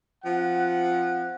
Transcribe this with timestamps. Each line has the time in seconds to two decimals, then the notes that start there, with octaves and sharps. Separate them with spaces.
0.25 F3 C4 F#5